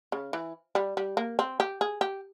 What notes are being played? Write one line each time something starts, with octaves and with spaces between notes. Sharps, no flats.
C#3
E3
G3
G3
A#3
C4
G4
G#4
G4